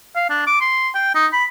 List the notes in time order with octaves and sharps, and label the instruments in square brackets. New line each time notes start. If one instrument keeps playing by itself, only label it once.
[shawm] F5
D4
D6
C6
G5
D#4
B5